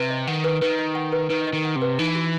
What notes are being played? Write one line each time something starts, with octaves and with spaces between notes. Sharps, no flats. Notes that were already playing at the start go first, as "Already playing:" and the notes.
Already playing: C3 B4
D#5
D#3 F#5
B4
D#3 B4
D#5
F#5
B4
D#3 B4
D#5
D#3
F#5
C3
B4
E3 D#4
F#4